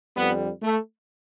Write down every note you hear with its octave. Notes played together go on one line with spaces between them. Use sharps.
F2 D3 G3 B3
A3